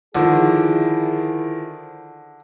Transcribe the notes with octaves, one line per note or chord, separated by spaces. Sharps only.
D3 D#3 F3 E4 G#4